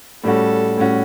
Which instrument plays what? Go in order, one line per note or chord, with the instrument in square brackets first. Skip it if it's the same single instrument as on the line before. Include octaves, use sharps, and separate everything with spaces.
[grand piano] A2 G3 C#4 F#4 [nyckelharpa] A4
[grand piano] A2 G3 C#4 F#4